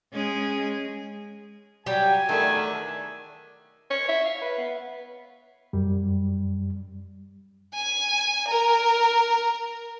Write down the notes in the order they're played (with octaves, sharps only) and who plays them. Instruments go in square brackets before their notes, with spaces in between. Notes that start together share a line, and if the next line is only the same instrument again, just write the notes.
[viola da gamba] G#3 C#4 G#4
[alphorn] F#3 [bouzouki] G3 G4 [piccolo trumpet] G#5
[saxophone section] E2 D#3 A3 [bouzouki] D4 [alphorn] A#4
[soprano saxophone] C#5
E5
F5
B4
B3
[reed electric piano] F#2 G3
[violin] G#5
A#4